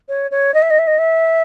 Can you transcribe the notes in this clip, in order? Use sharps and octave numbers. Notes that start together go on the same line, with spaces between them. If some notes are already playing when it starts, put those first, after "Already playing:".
C#5
C#5
D#5
E5
D#5
E5
D#5
E5